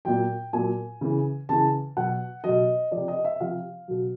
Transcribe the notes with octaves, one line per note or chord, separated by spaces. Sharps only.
A#2 F#3 G5
A#2 F#3 G#5
C#3 E3
C#3 E3 A5
B2 F#3 F#5
B2 F#3 D#5
F3 D5
C3
D#5
E5
C3 F3 F5
B2 F#3